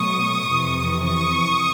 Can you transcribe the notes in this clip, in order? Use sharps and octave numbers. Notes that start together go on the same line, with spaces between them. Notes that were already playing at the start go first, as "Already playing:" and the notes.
Already playing: B2 F#3 A3 C#6 D#6
F2 C3 E3
C#6 D#6